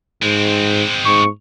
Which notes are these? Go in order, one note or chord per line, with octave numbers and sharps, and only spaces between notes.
G#2 G#3 C4
G#2 C#6